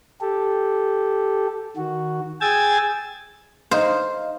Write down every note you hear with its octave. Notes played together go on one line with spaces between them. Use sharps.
G4 A4
D#3 F#4
G#4 G5 G#5 E6 G#6 A6
D#4 C5 D#5 F5